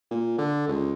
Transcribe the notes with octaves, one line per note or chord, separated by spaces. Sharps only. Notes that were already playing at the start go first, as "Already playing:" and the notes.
A#2
D3
C#2